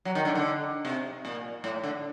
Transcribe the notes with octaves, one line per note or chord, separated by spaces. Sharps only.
F#3
D#3
D3
D3
C3
A#2
A2
D3